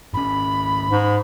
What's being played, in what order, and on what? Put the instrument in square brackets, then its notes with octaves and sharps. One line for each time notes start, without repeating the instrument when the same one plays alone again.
[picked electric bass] G#1 C#4 [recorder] B5
[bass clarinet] G#2